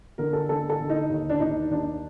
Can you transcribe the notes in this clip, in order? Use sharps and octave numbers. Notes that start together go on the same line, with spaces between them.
D3 A#4
A4
D3 A4
A4
D3
D#4
D#2
D4
D#2 D#4
D#2 D4